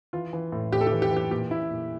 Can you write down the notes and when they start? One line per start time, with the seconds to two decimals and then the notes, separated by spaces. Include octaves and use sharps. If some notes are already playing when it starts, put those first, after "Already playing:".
0.13 E3 F4
0.33 E3
0.52 A2
0.72 A2 G4
0.81 A4
0.87 G4
0.92 E3
1.02 G4
1.11 E3
1.17 G4
1.31 A#2 G4
1.51 A#2 E4
1.70 A#2